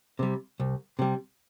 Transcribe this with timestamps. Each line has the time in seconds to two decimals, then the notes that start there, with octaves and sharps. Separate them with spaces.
0.19 C3 G3
0.60 C2
0.99 C3 G3